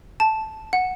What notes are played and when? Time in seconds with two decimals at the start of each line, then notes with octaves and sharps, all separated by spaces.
0.20 A5
0.73 F#5